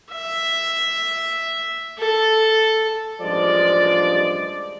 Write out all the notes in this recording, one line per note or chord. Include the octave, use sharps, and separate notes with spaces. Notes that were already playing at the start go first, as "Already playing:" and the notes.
E5
A4
A1 G2 F3 G#3 D5